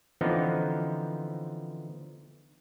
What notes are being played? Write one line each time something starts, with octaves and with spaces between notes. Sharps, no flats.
D3 E3 F3 B3 C4 D#4